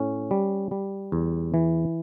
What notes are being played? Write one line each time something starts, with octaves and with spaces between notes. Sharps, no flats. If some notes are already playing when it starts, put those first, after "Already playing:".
Already playing: A2 C#4
G3
G3
E2
E3